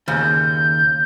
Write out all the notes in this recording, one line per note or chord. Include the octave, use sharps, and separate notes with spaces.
D#2 C#3 G6
G6